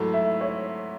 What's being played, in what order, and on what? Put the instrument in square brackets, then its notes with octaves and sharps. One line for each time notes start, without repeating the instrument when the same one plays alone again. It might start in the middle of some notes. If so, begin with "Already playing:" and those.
Already playing: [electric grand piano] G#2 F#3 A3 E4 [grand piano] A4
[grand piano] E5
C#5